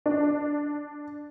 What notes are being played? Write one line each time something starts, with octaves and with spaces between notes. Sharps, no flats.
D4